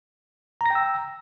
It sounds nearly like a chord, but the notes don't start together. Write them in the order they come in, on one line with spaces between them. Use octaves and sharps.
A#5 A#6 G5 E6